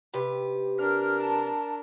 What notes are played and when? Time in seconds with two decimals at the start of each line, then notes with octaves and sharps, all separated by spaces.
0.14 C3 G4 B4
0.79 D4 A#4 F6
1.19 A5